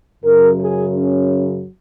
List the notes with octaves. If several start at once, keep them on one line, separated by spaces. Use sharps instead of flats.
F#2 C#3 F#3 A#4
G#4
C#4